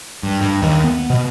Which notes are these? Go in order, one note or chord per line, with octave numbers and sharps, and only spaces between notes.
G2
G2
D#2
B3
B2